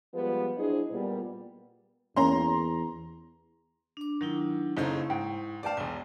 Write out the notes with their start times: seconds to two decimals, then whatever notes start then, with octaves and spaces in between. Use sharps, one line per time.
0.14 F3 G3 G#3 B3 B4
0.58 F#3 D4 E4 G#4 C5 D#5
0.91 A#2 G3 B3
2.16 E2 A#3 C#4 A#5 C6
3.97 D4 D6
4.21 D#3 F#3 D4 E4
4.77 F#1 C#3 D#4 E4 A4 C5 C#6
5.10 G#2 G5
5.63 B4 D5 F5 G5 A5
5.77 E1 B1 G#5